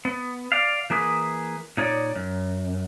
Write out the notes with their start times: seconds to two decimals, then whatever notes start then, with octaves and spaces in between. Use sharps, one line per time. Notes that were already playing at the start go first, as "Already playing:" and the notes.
0.05 B3
0.52 D5 F5
0.90 E3 A#3 G#4 B4
1.77 A#2 D#4 C#5 D5
2.16 F#2